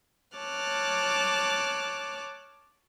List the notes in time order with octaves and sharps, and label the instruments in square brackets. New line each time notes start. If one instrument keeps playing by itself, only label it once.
[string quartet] C#5 A5 D6 F6 F#6